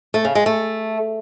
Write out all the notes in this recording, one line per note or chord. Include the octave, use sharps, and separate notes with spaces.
A3
C#3
G#3
A3